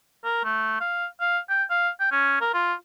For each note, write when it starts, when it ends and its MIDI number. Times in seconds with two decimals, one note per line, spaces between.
0.25 0.44 70
0.44 0.80 57
0.81 1.06 77
1.21 1.39 77
1.49 1.64 79
1.70 1.89 77
2.00 2.11 79
2.12 2.37 61
2.41 2.50 70
2.54 2.74 65